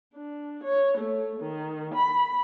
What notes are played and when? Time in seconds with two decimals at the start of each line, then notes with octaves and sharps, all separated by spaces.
0.14 D4
0.63 C#5
0.97 A3
1.40 D#3
1.93 B5